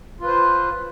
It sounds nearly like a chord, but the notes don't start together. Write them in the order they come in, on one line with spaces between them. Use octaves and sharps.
F4 B4 C5